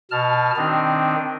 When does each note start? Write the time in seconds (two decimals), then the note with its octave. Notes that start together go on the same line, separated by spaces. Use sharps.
0.11 B2 A5 F6
0.56 D#3 C4 D4 D#4